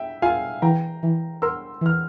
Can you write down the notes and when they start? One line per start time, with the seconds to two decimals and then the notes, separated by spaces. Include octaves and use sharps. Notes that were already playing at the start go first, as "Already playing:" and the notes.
Already playing: E5 G5
0.22 F4 F5 G#5
0.62 E3 G5 A#5
1.03 E3
1.42 A#4 C6 E6
1.81 E3 F6